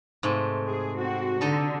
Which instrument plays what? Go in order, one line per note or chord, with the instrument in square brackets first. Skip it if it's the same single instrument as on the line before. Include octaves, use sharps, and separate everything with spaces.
[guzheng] G#2 C3 A3
[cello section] G#4
C4 F#4
[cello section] D3 [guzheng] D#4 A4 D#5